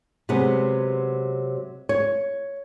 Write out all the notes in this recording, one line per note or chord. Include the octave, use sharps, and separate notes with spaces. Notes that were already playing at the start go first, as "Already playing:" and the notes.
C3 F#3 G#3 B3
C#5